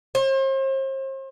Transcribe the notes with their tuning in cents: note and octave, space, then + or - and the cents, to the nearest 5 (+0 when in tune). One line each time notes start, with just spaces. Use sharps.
C5 +40